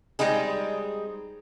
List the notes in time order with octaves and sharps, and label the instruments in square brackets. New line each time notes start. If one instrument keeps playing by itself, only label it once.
[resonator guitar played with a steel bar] G3 G#3 C4 D#4 G#4